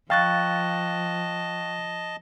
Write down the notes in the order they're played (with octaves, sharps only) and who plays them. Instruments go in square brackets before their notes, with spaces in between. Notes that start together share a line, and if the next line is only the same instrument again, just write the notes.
[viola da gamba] F3 [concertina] D#5 A5 [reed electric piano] F5 A6 [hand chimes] G5 C#6 F#6